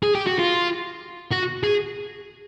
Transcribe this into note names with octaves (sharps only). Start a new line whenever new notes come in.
G#4
G4
F#4
F4
F#4
G#4